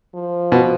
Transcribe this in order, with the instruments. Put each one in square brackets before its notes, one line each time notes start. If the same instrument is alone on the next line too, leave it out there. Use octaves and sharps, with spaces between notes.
[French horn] F3
[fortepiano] B2